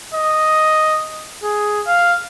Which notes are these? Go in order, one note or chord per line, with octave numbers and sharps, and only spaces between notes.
D#5
G#4
F5